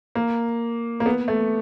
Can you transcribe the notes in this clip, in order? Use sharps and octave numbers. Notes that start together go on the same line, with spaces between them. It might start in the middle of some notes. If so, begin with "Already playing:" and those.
A#3
A#3
B3
A3